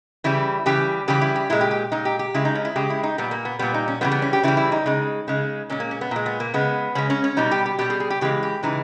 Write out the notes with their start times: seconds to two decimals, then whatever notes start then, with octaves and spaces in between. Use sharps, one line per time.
0.24 C#3 E3 G3 E4
0.66 C#3 E3 G3 G4
1.08 C#3 E3 G3 G4
1.21 E4
1.36 G4
1.50 A#2 G#3 E4
1.61 G4
1.71 G4
1.92 A#2 G#3 D#4
2.05 G4
2.19 G4
2.34 C#3 G#3 E4
2.45 D#4
2.55 C#4
2.65 E4
2.76 C#3 G#3 G4
2.90 E4
3.03 D#4
3.18 A#2 G3 B3
3.31 A#3
3.45 B3
3.59 A#2 G3 B3
3.74 D#4
3.88 C#4
4.01 C#3 E3 G3 B3
4.12 B3
4.22 C#4
4.33 G4
4.43 C#3 E3 G3 E4
4.57 E4
4.72 D#4
4.86 C#3 G#3
5.28 C#3 G#3
5.70 A#2 G#3 C#4
5.80 A#3
5.91 C#4
6.01 B3
6.11 A#2 G#3
6.26 B3
6.40 A#3
6.54 C#3 G#3 B3
6.95 C#3 G#3 C#4
7.10 C#4
7.24 C#4
7.37 B2 G3 D#4
7.51 G4
7.66 G4
7.79 B2 G3 G4
7.90 G#4
8.00 G#4
8.10 G4
8.21 C#3 E3 G#3 G4
8.43 G4
8.63 C#3 E3 G#3 D#4